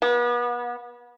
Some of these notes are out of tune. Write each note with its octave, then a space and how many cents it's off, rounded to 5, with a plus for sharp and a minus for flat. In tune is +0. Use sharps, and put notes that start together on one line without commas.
B3 -35